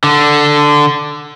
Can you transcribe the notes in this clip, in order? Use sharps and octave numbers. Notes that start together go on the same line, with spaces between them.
D3